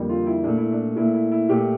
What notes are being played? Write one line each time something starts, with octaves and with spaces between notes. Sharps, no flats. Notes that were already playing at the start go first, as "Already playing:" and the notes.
Already playing: F2 D3 G3 A#3
F4
E4
A#2 A3 D4
E4
D4
A#2 A3 E4
E4
E4
A#2 A3 G4